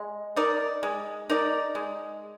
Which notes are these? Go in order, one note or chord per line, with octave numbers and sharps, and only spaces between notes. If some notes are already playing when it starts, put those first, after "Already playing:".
Already playing: G#3
D#4 A#4 D5
G#3
D#4 A#4 D5
G#3